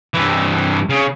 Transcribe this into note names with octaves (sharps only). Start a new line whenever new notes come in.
G2 E3
C#3